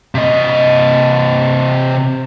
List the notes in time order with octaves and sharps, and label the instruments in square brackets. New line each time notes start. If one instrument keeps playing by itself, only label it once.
[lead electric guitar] C3 D#5